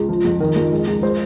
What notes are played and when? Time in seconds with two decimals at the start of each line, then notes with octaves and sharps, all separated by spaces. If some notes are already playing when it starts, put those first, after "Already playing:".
Already playing: C#2
0.09 F3
0.25 F2
0.40 D#3 A#4
0.56 F2
0.71 G#3
0.87 C#2
1.03 G#3 C5